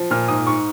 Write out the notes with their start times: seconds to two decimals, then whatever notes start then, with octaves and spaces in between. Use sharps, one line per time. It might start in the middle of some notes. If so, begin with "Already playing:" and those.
Already playing: F3
0.11 A#2 F6
0.28 G#2 D#6
0.47 G#2 C#6